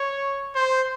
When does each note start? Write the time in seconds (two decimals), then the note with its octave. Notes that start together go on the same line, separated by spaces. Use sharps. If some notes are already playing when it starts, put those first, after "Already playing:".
Already playing: C#5
0.55 C5